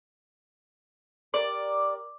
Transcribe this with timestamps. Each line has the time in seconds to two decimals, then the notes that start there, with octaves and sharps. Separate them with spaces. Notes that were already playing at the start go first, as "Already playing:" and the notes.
1.34 G4 A#4 D5